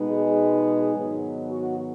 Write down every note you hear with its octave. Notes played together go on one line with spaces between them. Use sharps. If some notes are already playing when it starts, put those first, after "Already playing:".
Already playing: B2 G#3 B3 D#4
G#4
G#2 D#3 F#3 B3
F#4